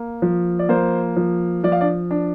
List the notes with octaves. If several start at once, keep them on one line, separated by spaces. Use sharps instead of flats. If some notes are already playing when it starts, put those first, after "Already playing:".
Already playing: A#3
F3
D5
A#3 C5
F3
F3 D5
F5
D4 D5
D4